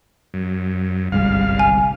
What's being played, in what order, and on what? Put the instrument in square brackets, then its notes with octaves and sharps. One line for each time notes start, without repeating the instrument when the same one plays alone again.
[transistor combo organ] F#2
[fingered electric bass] G1 C2 G#3 [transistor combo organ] G2 F5
[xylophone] G#5